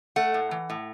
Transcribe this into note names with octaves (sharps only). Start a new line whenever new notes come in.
A3 F#5
A2
E3
A2